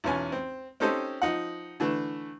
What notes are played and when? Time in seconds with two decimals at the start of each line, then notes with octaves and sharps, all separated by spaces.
0.04 B1 E2 C#4 G#5
0.32 C4
0.80 C4 C#4 D#4 G4 A4 C5
1.22 F3 D#4 F#5
1.80 D3 E3 A3